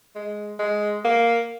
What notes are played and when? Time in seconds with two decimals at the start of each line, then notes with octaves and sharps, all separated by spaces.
0.15 G#3
0.59 G#3
1.04 A#3